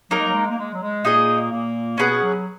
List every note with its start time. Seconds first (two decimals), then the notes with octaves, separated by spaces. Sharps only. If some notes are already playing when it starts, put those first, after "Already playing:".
0.10 F#3 A#3 D#4 A#4
0.18 G#3
0.26 F#3
0.33 G#3
0.49 A#3
0.58 G#3
0.72 F#3
0.81 G#3
1.05 A#2 A#3 D#4 G#4 D#5
1.51 A#2 A#3
1.98 B2 B3 C#4 G#4 B4 F#5
2.21 F#3